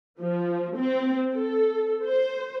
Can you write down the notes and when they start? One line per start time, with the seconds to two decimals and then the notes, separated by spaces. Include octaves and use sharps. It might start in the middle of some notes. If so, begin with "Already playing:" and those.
0.20 F3
0.78 C4
1.35 A4
2.06 C5